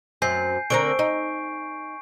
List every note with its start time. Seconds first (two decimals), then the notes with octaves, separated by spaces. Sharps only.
0.22 F#2 C4 G#5 G6 C7
0.70 D3 C4 A#4 C#6 D7
0.99 D#4